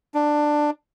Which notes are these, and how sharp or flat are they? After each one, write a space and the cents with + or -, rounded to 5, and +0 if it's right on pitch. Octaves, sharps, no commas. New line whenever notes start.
D4 +10